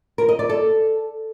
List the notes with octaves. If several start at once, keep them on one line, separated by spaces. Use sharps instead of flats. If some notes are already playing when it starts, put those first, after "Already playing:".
A#4
D#5
D5
A4